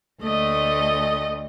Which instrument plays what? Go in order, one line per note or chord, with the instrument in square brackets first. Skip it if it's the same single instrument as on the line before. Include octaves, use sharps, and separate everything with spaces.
[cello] D2 [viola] A3 D#5